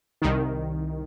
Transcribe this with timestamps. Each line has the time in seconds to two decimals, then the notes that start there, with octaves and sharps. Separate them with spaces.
0.22 C2 D#3